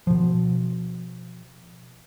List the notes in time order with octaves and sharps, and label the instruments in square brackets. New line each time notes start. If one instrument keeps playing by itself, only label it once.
[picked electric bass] B2 F3